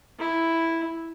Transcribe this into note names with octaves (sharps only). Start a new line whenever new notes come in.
E4